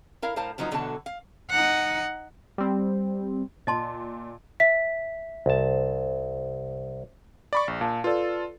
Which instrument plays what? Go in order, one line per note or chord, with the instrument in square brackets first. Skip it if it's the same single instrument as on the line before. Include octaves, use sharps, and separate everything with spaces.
[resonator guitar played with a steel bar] E4 A#4 F5
A2 A#4 C5 F5 A5
F#2 F3 F#3 A#3 D#4
E2 B2 D3 F#3 A4 A5
F5
[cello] D#4 F#5
[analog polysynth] G3 C4
[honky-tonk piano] A#2 [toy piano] D#5 A5 C6
[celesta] E5 B6
[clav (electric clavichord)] C2 A5
[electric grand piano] D5 B5 C#6
A#1
[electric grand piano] A#2 [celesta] F5 A5
[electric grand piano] F4 A4 [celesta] B4 D5